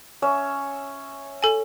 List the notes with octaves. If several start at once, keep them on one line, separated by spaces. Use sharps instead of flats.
C#4 C#5 E5
A4 G#5